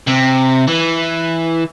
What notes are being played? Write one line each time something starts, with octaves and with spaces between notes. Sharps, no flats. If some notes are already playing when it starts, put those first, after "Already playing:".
C3
E3